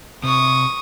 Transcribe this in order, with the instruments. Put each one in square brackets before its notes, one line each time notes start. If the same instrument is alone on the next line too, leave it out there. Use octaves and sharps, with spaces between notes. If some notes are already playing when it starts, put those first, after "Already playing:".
[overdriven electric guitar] C3 [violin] C#6 D#6